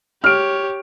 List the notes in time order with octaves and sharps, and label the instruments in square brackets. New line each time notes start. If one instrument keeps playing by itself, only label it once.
[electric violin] G4 C#5 [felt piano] F6 D7